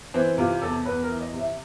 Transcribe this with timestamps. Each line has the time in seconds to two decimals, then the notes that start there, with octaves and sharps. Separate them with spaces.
0.14 E3 C4
0.38 C3 F4
0.61 E2 A4
0.85 E2 B4
1.03 A#4
1.09 E3
1.21 D#5
1.33 C3
1.39 E5